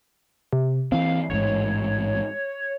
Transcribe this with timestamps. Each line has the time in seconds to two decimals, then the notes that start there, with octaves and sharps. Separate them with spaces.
0.53 C3
0.92 E3 C4 F5
1.30 A1 G#2 C#5